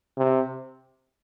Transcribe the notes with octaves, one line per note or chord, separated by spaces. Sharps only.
C3